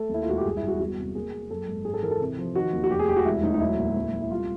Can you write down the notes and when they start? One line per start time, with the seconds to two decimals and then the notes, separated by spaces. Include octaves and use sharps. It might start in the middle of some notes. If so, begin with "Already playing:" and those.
Already playing: A3 A4
0.09 D#2 E4
0.23 F4
0.27 E1 F#4
0.38 G4
0.45 G1 G#4
0.57 G1 E4
0.68 F#4
0.80 E2 F#4
0.98 C3
1.15 A#3 G#4
1.33 A#3
1.51 F#2 A4
1.67 G#1
1.85 G#2 G#4
1.94 A4
2.03 E3 A#4
2.11 A4
2.20 C3
2.38 F3
2.55 D#3 F#4
2.73 D#2
2.84 F#4
2.91 F1 G4
2.99 G#4
3.08 F1 G4
3.16 F#4
3.25 E1 E4
3.43 D2 D#4
3.54 D#4
3.60 F#3 E4
3.78 A#2
3.96 D2
4.13 D2
4.22 E4
4.31 C2 F4